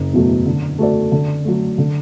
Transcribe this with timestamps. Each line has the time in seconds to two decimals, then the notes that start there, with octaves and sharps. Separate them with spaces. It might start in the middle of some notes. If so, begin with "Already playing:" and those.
Already playing: F#1
0.13 E2 B2 F#3 A3
0.46 D3
0.78 A3 F#4 A4 D5
1.12 D3
1.44 F#3 A3
1.78 D3